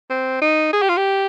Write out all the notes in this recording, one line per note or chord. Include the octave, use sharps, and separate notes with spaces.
C4
D#4
G#4
G4
F4
G4